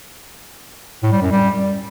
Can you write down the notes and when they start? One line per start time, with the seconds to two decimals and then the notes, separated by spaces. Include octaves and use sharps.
1.03 A2
1.13 G3
1.22 F#2
1.32 G3